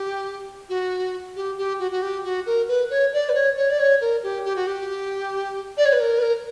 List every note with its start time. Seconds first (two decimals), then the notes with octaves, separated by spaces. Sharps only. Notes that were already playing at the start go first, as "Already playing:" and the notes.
Already playing: G4
0.69 F#4
1.36 G4
1.58 G4
1.79 F#4
1.91 F#4
2.02 G4
2.24 F#4
2.46 A#4
2.68 B4
2.90 C#5
3.13 D5
3.29 B4
3.34 C#5
3.56 C#5
3.70 D5
3.79 C#5
4.01 A#4
4.23 G4
4.45 G4
4.56 F#4
4.67 G4
5.77 D5
5.85 C#5
5.92 B4
6.00 A#4
6.18 B4
6.22 A#4